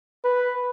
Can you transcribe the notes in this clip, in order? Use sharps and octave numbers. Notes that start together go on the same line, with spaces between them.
B4